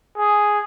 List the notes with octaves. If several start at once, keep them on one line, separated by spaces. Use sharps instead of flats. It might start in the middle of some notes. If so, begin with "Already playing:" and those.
G#4